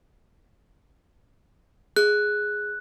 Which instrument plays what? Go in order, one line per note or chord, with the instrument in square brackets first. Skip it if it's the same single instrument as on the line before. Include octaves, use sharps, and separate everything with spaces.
[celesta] G#4 [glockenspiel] F#6